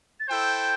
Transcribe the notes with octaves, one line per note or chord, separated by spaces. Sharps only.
A6
E4 A4 C5 G5 G6